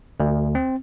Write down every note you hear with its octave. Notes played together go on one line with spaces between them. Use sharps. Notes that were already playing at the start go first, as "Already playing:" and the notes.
D2
C4